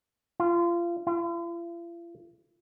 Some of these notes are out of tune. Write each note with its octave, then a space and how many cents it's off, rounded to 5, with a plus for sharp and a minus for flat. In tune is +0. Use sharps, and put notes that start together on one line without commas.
F4 -25
F4 -45